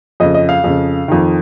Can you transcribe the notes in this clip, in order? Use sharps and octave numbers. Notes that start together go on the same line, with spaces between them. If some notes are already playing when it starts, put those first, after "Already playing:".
F2 C#3 D#5
D#5
F5
F2 C#3
F2 D#3